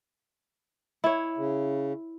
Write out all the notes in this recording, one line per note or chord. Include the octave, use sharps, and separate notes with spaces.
E4 C#5
C#3